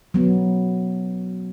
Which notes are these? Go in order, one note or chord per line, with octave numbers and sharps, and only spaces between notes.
F#3 B3